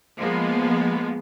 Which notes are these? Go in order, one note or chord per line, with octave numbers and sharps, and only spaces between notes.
F3 G#3 A#3 B3